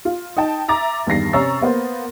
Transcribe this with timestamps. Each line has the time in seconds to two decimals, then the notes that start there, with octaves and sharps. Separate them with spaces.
0.05 F4
0.36 D#4 D#5 G5 A5
0.68 E5 A#5 D6 A6
1.07 E2 G2 D#3 A#6 C7
1.33 C3 C#4 A#5 C#6 E6 A6
1.61 A#3 B3 A#4 C5